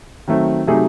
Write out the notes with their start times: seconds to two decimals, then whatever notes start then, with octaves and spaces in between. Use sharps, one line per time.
0.28 D#3 F#3 A3 C4
0.67 C3 F#3 A3 D#4 G#4